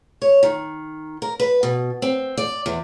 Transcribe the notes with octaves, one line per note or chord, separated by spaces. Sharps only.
C#5
D#3
A#4
B4
B2
C4
D5
E2